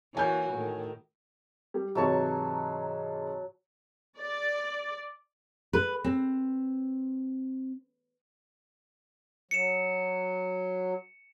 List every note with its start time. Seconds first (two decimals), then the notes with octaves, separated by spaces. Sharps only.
0.15 E3 A#3 F#4 C#5 G#5 G6
0.54 A2 D#3
1.74 G3
1.95 G#2 C3 E3 F#3 A5 C#6
4.18 D5
5.73 B4
6.04 C4
9.51 F#3 C#7 E7